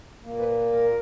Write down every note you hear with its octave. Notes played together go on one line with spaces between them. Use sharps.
A#2 A#3
B4
A#4